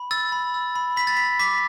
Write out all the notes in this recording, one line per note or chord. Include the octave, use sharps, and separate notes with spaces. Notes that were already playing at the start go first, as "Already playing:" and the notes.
Already playing: B5
E6 A6
B5
E6
B5
B5 B6
A6
B5 B6
D6 B6